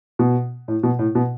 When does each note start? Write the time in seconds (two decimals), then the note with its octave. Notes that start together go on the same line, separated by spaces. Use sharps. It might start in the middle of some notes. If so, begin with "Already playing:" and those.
0.19 B2
0.68 A2
0.83 B2
0.99 A2
1.15 B2